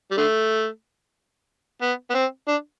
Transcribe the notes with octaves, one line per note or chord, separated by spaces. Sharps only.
G3
D3 A3
B3
B3
C4
D4